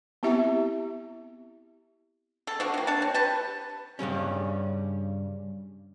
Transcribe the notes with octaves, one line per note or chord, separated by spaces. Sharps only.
B3 C4 E4 G4 E5
C#3 A4
F3 D4 F#4
C3 A#3
E3 D4 C#5 A5
C4
G4 B4 A5
G2 C#3 G3 C#4